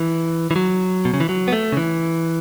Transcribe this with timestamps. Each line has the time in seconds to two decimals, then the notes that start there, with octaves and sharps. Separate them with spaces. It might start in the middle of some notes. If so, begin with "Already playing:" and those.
Already playing: E3
0.51 E3
0.56 F#3
1.05 B2
1.14 C#3
1.20 E3
1.29 F#3
1.48 B3
1.52 A3
1.72 C#3
1.77 E3